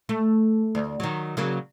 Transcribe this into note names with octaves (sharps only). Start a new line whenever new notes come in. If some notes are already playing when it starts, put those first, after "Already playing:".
A3
D2
D#3 F#3
C#3 F#3 A#3